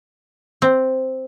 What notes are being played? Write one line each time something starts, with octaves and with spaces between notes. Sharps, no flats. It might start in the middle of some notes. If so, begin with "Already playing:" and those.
C4